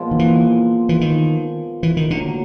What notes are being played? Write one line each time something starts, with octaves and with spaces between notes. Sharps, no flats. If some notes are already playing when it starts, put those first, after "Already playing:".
Already playing: A#2 F3 G#3 B3
D#3
E3
E3
D#3
E3
D#3
A2 D3 F#3 A#3